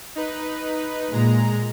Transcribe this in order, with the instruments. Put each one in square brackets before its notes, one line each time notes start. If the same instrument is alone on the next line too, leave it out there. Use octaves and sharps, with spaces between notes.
[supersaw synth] D#4 B4
[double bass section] A#2 [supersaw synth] G#3 A#5